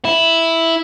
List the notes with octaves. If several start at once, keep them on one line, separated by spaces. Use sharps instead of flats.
E4